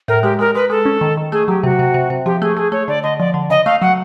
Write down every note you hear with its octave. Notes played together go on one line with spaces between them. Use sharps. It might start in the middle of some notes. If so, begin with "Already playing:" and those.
A2 A#4
G#3 G4
G#3 A#4
G#3 B4
G#3 A4
C#4
D#3
D#3
A3 G#4
F#3 G4
C3 F#4
C3
C3
C3
F3 G4
A3 G#4
A3 G#4
A3 C#5
D3 D5
D3 D#5
F3 D5
D3
C#3 D#5
A3 F5
F#3 F#5